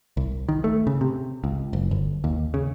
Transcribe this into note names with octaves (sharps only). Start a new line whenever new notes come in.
C2
D#3
A3
C#3
C3
C#2
F#1
G1
D#2
C#3